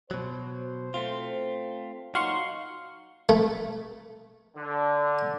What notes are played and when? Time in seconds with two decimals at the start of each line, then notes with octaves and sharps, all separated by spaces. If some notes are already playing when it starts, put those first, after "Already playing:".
0.11 B2 F#3 C5
0.94 A3 C4 F4
2.15 A#2 F#3 D#4 F#4 F5 C6 C#6
3.29 A3
4.56 D3